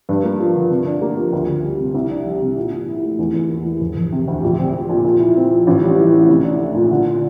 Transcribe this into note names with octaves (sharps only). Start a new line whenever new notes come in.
G2
A#3
F3
D3
C3
D4
A#3
F3
D2
D2
G3
C3
C2
D4
G3
C3
A#2
A#2
E4
A3
E2
E2
A#3
E3
E1
E1
C3
D2
A#1
C4
F3
A#2
A#2
E4
C4
F3
A1
G3
E3
A2
C2
D4
A3
A#2
D3
D4